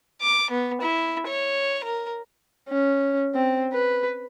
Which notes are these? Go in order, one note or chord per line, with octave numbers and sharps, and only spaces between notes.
D6
B3
E4
C#5
A#4
C#4
C4
B4